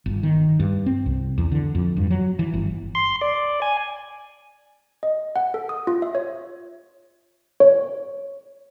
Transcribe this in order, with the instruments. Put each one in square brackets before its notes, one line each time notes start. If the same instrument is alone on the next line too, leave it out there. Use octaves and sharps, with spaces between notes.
[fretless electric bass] G1
D#3
G2
C4
C2
E2
D3
F2
G2
F#3
E3
G1
[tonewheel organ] C6
D5
G#5
[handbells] D#5
F#5
A4
D#6
F4
E5
C#5
C#5